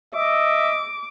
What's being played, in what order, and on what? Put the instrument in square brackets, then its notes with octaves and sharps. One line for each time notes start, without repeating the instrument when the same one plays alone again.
[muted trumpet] D#5 [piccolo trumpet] E5 [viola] D6